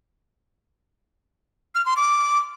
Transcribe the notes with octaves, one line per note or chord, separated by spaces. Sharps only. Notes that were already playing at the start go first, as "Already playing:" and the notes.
F6
C6
D6